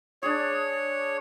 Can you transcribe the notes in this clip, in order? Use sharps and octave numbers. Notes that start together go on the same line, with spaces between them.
D4 G#4 C#5